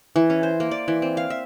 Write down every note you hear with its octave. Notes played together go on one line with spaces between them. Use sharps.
E3
C#4
C5
A#3
D5
E3
C4
F5
E5